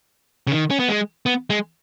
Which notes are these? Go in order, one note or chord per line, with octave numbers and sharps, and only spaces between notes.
C#3
D#3
C#4
B3
G#3
B3
G#3